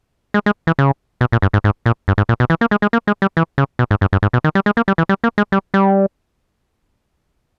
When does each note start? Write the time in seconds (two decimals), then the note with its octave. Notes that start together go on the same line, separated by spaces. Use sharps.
0.34 G#3
0.46 G#3
0.67 E3
0.79 C#3
1.21 B2
1.32 A#2
1.42 G2
1.53 G#2
1.64 G#2
1.86 A#2
2.08 G2
2.18 G#2
2.29 A#2
2.40 B2
2.50 E3
2.61 A#3
2.71 G#3
2.82 G#3
2.93 A#3
3.07 G#3
3.22 G3
3.37 E3
3.58 C#3
3.79 B2
3.91 G#2
4.01 G2
4.13 G2
4.23 G#2
4.33 B2
4.44 D#3
4.55 G3
4.66 G#3
4.77 A#3
4.88 G3
4.98 E3
5.09 G3
5.24 A#3
5.38 G#3
5.52 G3
5.74 G3